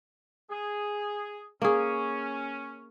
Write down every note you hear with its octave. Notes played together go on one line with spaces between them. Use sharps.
G#4
A#3 C#4 G#4